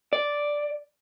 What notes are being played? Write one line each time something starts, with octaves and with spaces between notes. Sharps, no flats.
D5